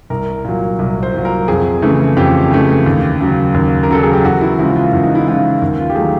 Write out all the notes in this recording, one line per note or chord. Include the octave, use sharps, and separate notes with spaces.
C2 A#4
A#2 F#3
C2
C5
A#2 F#3
A#4
F2 G#4
C#3 E3 A3
F2 G4
C#3 E3 A3
D#2
C#3 F#3
D#2
A#4
C#3 F#3 A4
G#4
G4
E2 F#4
E4
C#3 F3 G#3 E4
F4
E2
D#4
E4
C#3 F3 G#3 F4
D#2
F4
G4
D#3 F#3 A3 G#4